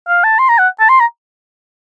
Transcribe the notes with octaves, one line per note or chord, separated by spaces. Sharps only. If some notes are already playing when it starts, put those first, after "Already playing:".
F5
A5
C6
A#5
F#5
A5
C6
A#5